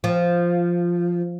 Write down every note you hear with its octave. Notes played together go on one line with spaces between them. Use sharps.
F3